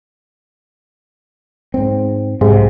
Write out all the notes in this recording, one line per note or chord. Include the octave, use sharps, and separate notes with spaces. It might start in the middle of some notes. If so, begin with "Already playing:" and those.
G#2 C4
B1 G#2 C3